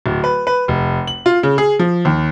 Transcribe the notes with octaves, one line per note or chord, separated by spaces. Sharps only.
D1
B4
B4
F1
F#7
F4
C#3
G#4
F3
D#2